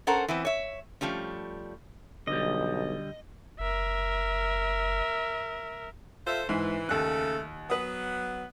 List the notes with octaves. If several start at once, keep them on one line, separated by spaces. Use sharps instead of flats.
C#4 A4 A#4 C5 F#5
E3 B3 C4
C#5 E5
F3 G3 A3 C#4
B1 D3 G3 D#5
F#1 A#4 E5
F4 A4 C5 E5
G#2 E3
D#2 C#3 A3 A4 F#6
F#3 B3 B4 D#6